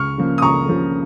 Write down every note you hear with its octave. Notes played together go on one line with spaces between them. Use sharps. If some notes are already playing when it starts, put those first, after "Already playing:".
Already playing: C#2 C#6 F6
C#3 F3 A#3
D#6
C#2 A#5 C#6
C#3 F3 A#3